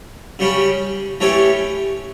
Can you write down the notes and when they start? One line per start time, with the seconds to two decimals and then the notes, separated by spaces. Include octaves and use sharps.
0.39 C#3 G3 C#4 G4
1.20 E3 A3 C#4 G4 C#5